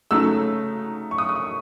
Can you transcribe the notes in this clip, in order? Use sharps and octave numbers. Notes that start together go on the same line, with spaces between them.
C#3 F#3 A3 D#4 E6
C#6
D#6
D#6
C#6